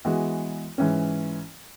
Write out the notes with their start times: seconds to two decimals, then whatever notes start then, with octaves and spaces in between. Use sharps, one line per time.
0.05 E3 G#3 B3 F#4
0.78 G#2 E3 C#4